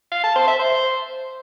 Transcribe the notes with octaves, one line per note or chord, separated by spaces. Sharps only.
F5
A5
C5
E5
C5